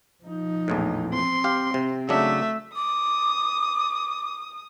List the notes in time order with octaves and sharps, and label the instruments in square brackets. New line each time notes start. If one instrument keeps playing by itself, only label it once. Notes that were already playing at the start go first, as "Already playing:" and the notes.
[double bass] F3 D#4
[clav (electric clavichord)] A#1 E2 A2
[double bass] C4 [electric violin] C6
[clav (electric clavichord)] G4 F5
C3
[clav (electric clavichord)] C#3 F#3 D4 [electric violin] A3 E5
[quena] D6 [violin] D#6